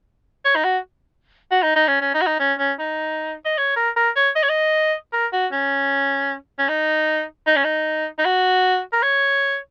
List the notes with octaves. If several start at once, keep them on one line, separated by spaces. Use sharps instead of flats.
C#5
D#4
F#4
F#4
D#4
D#4
C#4
C#4
D#4
F#4
D#4
C#4
C#4
D#4
D#5
C#5
A#4
A#4
C#5
D#5
C#5
D#5
A#4
F#4
C#4
C#4
D#4
D#4
C#4
D#4
D#4
F#4
A#4
C#5